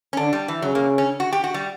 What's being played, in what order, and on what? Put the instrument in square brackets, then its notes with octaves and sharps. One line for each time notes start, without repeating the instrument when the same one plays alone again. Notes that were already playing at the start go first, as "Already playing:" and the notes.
[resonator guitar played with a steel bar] C#4
[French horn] D3 [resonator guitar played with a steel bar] D4
[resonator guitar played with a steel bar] G3
E3
[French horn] C#3 [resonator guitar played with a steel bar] F#3
[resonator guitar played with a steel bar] A#3
C#4
F#4
G4
F#4
G3